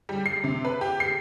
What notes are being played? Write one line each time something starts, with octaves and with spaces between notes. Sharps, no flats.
G3
C7
C3
B4
G4
C7